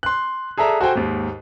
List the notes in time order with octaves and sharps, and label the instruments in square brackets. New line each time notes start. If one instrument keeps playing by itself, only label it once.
[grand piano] C6 F#6
G#4 A4 D5 E5 A#5
F#4 A4 C5 G5 G#5
D#2 G#2